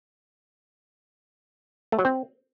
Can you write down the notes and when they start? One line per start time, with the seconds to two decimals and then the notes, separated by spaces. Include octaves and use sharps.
1.92 A3
1.99 F#3
2.05 C4